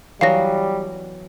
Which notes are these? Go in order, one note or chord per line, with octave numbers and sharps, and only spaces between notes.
E3 F#3 G3 B3 F5 A#6